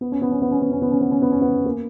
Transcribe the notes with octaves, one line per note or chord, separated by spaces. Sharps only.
B3
C#4
B3
C#4
B3
C#4
B3
C#4
B3
C#4
B3
C#4
B3
C#4
B3
A#3